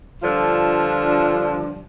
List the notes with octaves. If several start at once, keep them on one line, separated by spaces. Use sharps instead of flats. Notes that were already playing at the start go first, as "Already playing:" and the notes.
G2 D3 F3 D4 F4